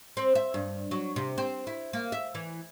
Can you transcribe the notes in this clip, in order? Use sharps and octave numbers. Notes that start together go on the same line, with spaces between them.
C4
E5
G2
F#3
C3
C4
E4
A#3
E5
E3